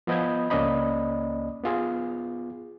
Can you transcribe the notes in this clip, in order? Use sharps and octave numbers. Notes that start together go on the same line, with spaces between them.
F3 B3 D#5 B5 G6 G#6
C#2 A#3 C#4 D5 D#5 B5
B3 F4 G#4